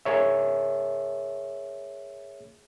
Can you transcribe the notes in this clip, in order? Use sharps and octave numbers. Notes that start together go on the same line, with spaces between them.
G#4 A#4 C#5 E5